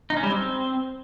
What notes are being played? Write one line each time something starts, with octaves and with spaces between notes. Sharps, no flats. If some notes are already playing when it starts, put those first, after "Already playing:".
D#4
C#4
G3
C4